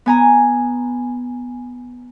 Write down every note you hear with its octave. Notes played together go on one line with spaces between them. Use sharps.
B3 G#5 A#5